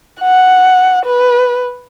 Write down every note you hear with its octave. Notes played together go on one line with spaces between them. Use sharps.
F#5
B4